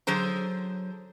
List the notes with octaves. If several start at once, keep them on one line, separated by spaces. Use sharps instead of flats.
D3 F#3 G#4 C5 A#5